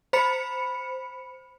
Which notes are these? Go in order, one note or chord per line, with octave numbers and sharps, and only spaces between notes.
C5 B5 C#7